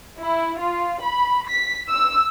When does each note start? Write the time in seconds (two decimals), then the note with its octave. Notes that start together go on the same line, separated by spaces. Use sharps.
0.19 E4
0.62 F4
1.03 B5
1.48 B6
1.89 E6